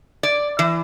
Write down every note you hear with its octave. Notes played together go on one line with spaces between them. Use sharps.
D5
E3